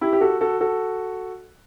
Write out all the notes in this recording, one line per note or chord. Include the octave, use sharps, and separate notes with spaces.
E4 G4
G4
F#4 A4
F#4 A4
F#4 A4